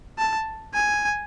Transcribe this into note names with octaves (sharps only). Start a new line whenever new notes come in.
A5
G#5